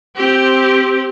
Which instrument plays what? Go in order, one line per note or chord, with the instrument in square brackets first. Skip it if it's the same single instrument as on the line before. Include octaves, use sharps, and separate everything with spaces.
[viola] C4 G4